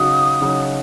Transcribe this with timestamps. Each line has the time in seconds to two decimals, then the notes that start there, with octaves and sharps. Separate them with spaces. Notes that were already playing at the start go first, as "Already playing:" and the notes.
Already playing: C#3 F#3 D#4 F#4 D#6
0.41 C#3 F#3 D#4 F#4